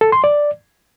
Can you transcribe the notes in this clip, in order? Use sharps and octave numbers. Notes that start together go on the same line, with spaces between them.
A4
C6
D5